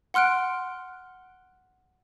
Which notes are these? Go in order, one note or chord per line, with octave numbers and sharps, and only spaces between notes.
F#5 C6 F6 F#6 D7